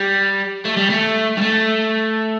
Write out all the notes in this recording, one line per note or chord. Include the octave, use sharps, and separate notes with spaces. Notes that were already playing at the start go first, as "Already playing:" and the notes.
Already playing: G3
A3
G3
A3
G3
A3